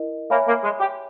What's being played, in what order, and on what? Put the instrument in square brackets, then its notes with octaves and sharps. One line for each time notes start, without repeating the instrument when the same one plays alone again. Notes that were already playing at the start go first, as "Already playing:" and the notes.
Already playing: [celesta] E4 A#4 D#5
[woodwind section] A#3 [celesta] C#5 E5 G#5 B5
[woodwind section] A#3
G#3
G4